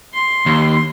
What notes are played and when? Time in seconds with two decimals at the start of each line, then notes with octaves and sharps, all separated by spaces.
0.14 C6
0.46 D#2